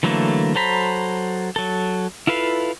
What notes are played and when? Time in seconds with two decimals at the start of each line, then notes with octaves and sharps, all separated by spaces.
0.03 D3 E3 F#3 A3 A#3
0.55 F#3 A4 C5 A#5 B5
1.56 F#3 A4
2.27 E4 F4 A4 B4 F5